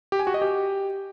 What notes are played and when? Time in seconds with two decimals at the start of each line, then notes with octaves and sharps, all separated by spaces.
0.12 G4
0.19 G#5
0.27 F#4
0.34 D#5
0.42 G4